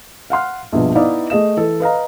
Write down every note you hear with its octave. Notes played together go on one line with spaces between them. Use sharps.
F5 F#5 C6 F6
A#1 G2 B2 F3
B3 D#4 E4 D5 D#5 F5
A3 G#4 D#5 E7
E3 A4
B4 D#5 F5 A#5